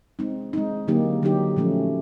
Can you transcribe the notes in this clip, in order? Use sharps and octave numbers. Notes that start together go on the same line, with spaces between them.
G#3 C4 D#4
G#3 C4 D#4
D3 F#3 A#3 D#4 G4
D3 F#3 A#3 D#4 G4
A#2 F3 A3 C#4